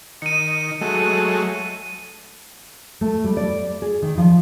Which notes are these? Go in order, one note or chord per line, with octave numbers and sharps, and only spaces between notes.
D#3 C#7 D#7
F#3 G#3 A3
A3
G3
D5
G#4
D#3
F3